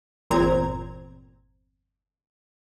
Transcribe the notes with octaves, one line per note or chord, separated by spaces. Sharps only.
G1 E2 A#2 C4 A#5 G#6